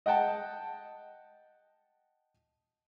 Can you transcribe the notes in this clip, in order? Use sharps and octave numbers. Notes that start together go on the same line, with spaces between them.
D#5 F#5 G5 A5